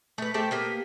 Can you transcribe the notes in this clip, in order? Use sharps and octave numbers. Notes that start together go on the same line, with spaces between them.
A3 B4
A3 G4 C5 A5
A#3 B3 G4